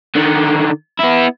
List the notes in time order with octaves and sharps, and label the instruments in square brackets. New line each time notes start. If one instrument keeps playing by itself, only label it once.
[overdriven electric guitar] D3 D#3
B3 E4